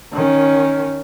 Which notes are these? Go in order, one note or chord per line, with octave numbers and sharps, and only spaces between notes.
D#3 C#4